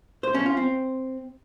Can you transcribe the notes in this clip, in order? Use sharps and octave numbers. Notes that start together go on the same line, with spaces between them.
C5
C#4
F4
C4